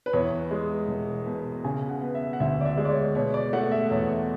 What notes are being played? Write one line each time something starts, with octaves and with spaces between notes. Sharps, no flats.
B4
E2 C#5
G#3
E1
B2
C#3 G#5
F#5
B3
E5
F#5
D2 E5
D5
E5
G#3
D5
C#5
B2 C#5
D5
A3 F#5
E5
E2 C#5